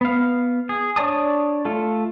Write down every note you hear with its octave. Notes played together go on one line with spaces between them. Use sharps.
B3 F5
G#4
D4 C#5 D5 A5 D#6
A3 F4 A4